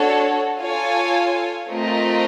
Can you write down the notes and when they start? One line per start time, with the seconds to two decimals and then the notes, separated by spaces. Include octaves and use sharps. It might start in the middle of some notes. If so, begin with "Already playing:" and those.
Already playing: D4 F#4 A4 C#5
0.60 F4 A4 C#5 F5 G#5
1.70 A3 C4 F4 A#4 D#5